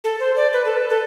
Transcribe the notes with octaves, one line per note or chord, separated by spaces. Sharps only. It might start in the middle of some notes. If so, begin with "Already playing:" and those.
A4
C5
D5
B4
A4
B4
A4